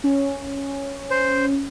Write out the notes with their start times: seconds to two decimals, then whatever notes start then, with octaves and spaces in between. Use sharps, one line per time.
0.04 C#4
1.11 C5